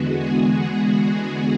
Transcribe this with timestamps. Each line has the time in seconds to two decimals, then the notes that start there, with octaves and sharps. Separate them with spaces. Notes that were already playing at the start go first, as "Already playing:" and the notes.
Already playing: E2 D3 G#3 B3 F#4
0.17 G#4
0.70 F#4
1.22 G#4